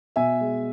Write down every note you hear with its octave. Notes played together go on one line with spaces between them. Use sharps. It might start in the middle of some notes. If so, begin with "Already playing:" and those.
B2 E5 G#5
G#3